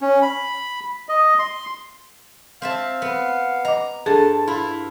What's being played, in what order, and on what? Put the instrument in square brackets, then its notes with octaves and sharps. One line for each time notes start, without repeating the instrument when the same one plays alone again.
[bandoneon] C#4
B5
D#5
C6
[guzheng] C4 E5 A5 [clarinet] F5
[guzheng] B3
[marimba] D#5 D6 [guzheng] A#5
[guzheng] G2 [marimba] G#4 A4 [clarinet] A5
[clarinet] E4 [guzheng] F4